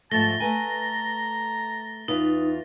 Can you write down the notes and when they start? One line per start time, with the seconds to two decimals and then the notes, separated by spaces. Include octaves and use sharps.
0.11 G#2 F3 A3 A5 A6 A#6 G7
0.40 A3 B4 G#5 A#5
2.08 E2 D#4 F4 B4